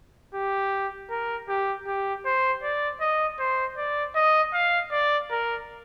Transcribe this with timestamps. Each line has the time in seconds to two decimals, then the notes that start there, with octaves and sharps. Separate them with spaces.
0.34 G4
1.11 A#4
1.49 G4
1.87 G4
2.26 C5
2.63 D5
3.01 D#5
3.40 C5
3.78 D5
4.15 D#5
4.54 F5
4.92 D5
5.31 A#4